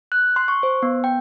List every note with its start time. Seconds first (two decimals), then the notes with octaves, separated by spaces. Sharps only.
0.12 F#6
0.36 C6
0.48 C#6
0.63 C5
0.83 B3
1.04 G5